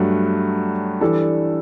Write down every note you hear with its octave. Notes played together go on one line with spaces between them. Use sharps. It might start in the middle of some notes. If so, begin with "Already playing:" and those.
Already playing: G2 F#3 A3
E3 G3 D4 A4